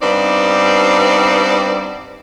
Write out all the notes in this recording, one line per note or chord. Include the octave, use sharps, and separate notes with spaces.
G2 B3 C4 D#4 D5